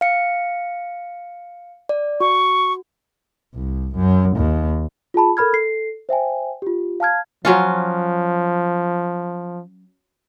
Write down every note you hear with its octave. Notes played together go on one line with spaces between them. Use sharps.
F5 C#7
D5
F#4 C#6
C2
F#2
D#2
F4 G#4 A5 B5
A4 A#4 B5 F6 G#6
A4 C7
C5 E5 G5 G#5
F4 G4
F5 A5 F6 G#6
F3 F#3 C#4 F4